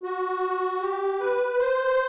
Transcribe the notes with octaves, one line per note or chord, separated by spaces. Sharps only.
F#4
G4
B4
C5